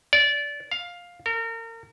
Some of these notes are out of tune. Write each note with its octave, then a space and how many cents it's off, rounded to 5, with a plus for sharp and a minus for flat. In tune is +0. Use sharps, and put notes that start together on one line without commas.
D5 -20
F5 +10
A#4 -35